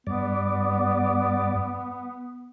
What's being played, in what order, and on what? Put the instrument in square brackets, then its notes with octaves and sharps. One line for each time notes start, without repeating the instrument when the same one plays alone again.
[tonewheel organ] G2 D5 [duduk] B3